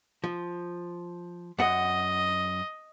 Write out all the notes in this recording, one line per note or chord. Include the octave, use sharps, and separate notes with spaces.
F3
F#2 D#5 F#5